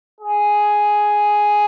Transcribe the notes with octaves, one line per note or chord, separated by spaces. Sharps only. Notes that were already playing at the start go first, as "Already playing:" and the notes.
G#4